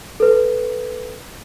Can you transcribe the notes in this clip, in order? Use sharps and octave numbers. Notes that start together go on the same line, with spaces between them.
A4 B4